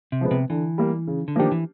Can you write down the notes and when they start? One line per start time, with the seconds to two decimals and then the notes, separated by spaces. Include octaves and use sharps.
0.12 C3
0.21 F3 G#3 B3
0.31 C3
0.50 D3 E3
0.78 G3 A#3
1.07 C#3
1.28 D3
1.36 D#3 F3 A#3 D4 G4
1.52 E3